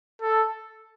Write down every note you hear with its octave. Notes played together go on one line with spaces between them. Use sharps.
A4